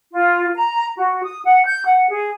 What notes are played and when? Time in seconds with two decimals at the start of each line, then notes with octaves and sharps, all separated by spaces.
0.11 F4
0.55 A#5
0.97 F#4
1.24 D#6
1.45 F#5
1.65 G6
1.85 F#5
2.10 G#4